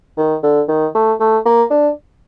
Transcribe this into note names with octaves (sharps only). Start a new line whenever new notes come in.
D#3
D3
D#3
A3
A3
A#3
D4